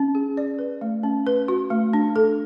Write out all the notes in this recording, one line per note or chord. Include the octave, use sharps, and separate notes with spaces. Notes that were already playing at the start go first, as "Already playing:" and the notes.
Already playing: C#4
G#4
D5
B4
A3
C#4
B4
F#4
A3
D4
A4